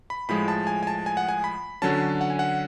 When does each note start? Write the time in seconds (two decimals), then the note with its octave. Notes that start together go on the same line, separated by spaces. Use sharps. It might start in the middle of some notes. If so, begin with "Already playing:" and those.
0.10 B5
0.29 A2 F3 G#3 B5
0.48 A5
0.67 G#5
0.83 G#5
0.87 A5
1.06 G#5
1.17 F#5
1.29 G#5
1.44 B5
1.82 D3 F#3 C#4 A5
2.21 F#5
2.30 G#5
2.39 F#5